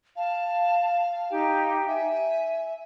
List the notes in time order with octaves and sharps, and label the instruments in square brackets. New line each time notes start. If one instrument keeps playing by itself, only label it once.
[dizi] F5 [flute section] A5
[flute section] D#4 G4 G5
[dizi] E5 [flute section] G#5